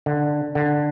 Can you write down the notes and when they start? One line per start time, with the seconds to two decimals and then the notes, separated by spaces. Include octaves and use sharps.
0.06 D3
0.55 D3